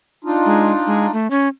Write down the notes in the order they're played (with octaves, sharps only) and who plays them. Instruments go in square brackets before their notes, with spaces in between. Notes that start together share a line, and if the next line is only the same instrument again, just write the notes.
[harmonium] D4 D#4 F4
[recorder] G#3
G#3
A3
C#4